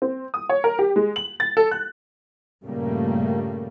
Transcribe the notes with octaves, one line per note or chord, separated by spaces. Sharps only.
C4
D#6
C#5
A#4
G4
G#3
F#7
A6
A4
F#6
G2 A#2 C#3 G3 A3 A#3